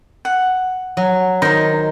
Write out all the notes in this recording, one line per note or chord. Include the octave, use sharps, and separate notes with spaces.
F#5
F#3
D#3 D#4 C5